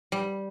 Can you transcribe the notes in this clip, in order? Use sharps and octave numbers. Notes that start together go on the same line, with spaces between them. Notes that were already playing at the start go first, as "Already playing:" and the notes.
G3